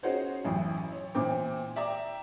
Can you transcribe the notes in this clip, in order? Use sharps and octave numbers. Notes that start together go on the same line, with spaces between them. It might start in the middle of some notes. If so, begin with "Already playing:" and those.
C#4 D#4 F#4 G#4 C5 C#5
A1 F#2 E3
C#5
A#2 E3 C4 G5 D6
D5 E5 G5 A#5 D6